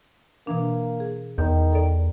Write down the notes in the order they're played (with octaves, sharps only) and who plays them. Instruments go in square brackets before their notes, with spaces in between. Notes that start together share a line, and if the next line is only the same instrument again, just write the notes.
[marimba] B2 E3 D4 [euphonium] A#3
[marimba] G#4
[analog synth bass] E2 [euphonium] D#3 [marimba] G6
[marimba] A4 D5